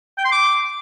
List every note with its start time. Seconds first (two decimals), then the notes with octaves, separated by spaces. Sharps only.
0.18 G5
0.25 C6
0.32 D6